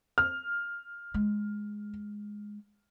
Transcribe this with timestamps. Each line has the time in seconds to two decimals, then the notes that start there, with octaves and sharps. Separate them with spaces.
0.18 F6
1.14 G#3